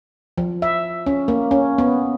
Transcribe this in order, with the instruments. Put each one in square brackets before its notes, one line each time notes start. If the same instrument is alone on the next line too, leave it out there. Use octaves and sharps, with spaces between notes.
[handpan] F3
E5
C#4
A#3
C#4
B3